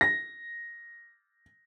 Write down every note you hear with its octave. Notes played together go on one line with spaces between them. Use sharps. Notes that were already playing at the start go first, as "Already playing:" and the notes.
A#6